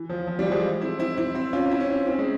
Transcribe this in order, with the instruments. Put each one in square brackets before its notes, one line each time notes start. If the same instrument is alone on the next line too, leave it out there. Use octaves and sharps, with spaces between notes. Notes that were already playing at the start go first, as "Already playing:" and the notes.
Already playing: [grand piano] E3
F3
F3
E3 G3
F3 G#3
C4 E4
C4 E4
C4 E4
C4 E4
C#4 F4
C4 E4
C#4
C4 E4
C4 E4
C#4
G#3 C4